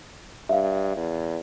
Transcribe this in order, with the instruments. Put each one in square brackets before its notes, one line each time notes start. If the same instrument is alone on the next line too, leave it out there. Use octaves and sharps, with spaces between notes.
[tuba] G2 [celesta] E5 F5
[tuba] E2